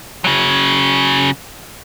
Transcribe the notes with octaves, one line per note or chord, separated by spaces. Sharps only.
C#3 F#3